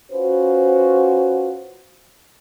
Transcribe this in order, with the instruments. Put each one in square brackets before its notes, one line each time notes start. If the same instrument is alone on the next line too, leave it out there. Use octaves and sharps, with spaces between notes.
[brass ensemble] C#4 F4 F#4 B4 C5